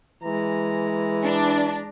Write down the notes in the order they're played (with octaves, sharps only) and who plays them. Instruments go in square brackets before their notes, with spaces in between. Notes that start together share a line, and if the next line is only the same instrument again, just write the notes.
[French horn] E3 [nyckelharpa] G#3 A#5
[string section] D4